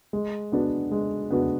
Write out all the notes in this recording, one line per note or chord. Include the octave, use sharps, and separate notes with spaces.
G#3
B3 D4 F#4 B4
G#3
B3 D4 F#4 B4